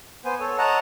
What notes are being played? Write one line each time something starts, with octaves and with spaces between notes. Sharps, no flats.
B3 C5 G#5
A4 C#5
C#5 D#5 F#5 A5 A#5